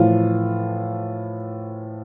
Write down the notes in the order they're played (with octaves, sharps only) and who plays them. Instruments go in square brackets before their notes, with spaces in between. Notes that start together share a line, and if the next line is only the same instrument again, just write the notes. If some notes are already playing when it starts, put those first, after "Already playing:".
Already playing: [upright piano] A2 E3 F3 F4